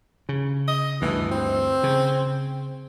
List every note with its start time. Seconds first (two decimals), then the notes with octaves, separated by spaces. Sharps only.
0.29 C#3
0.68 D#5
1.02 D2 G2 E3
1.31 C4
1.83 C#3